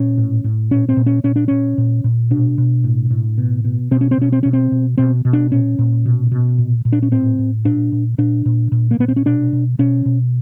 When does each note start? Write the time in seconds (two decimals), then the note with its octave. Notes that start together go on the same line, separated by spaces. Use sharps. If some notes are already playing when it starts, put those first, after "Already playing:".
Already playing: A#2 C#4
0.17 A2
0.44 A2
0.71 A#2 C#4
0.89 C4
0.97 A#2
1.06 C#4
1.24 A#2 C#4
1.36 D4
1.48 A#2 C#4
1.78 A#2
2.04 A#2
2.31 B2 D4
2.58 B2
2.84 A2
3.10 A2
3.38 B2
3.65 B2
3.91 B2 C4
4.01 C#4
4.11 C4
4.18 B2 C#4
4.32 C4
4.43 B2 C#4
4.53 C4
4.72 B2
4.98 B2 C4
5.25 B2
5.33 D4
5.51 A#2 C#4
5.79 A#2
6.06 B2
6.32 B2
6.58 A#2
6.85 A#2
6.93 D4
7.02 C#4
7.12 A2 C4
7.39 A2
7.65 A#2 D4
7.92 A#2
8.18 A#2 D4
8.46 A#2
8.72 A#2
8.91 A#3
8.98 A#2 B3
9.08 C4
9.16 C#4
9.25 B2 D4
9.53 B2
9.79 B2 C#4
10.06 B2